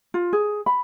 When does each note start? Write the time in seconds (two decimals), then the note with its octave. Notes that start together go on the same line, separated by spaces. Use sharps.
0.14 F4
0.33 G#4
0.66 B5